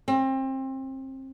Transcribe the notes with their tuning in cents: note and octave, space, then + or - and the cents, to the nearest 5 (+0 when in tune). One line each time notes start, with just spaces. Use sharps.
C4 +30